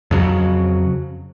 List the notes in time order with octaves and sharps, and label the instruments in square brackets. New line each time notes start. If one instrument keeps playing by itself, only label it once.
[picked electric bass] F2 C#3 F#3